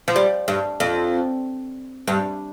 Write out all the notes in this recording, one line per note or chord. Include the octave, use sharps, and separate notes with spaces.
F3
G3
G2
F2
G2